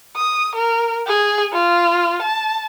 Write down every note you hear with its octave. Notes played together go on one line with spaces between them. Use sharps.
D#6
A#4
G#4
F4
A5